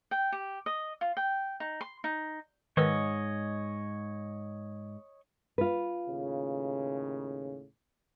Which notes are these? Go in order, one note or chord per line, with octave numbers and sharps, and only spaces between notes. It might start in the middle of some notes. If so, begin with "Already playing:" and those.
G5
G4
D#5
F4
G5
D#4
C6
D#4
G#2 D#3 B4 C#5 D#5 E6
F4 B4
D#2 A2 C#3